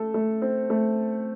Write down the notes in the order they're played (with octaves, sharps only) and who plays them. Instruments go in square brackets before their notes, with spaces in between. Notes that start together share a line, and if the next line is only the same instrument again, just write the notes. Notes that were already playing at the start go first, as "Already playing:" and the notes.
Already playing: [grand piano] A3 A4
A3
C4
A3